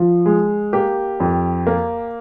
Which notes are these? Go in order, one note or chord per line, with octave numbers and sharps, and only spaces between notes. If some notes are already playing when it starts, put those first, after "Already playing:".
Already playing: F3
G#3
A#3 G4
F2
A#3